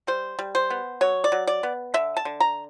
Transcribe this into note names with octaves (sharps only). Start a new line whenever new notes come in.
G3 C5
G3
C5
B3
F#3 C#5
D5
F#3
D5
B3
D3 E5
A5
D3
A#5